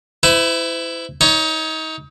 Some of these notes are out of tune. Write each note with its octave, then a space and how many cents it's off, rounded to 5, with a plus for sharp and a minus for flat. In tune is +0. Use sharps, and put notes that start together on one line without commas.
E4 +5 C5 -45
D#4 +30 C#5 +15